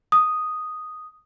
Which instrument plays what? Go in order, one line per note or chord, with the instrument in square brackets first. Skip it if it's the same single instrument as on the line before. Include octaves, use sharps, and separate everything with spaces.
[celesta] D#6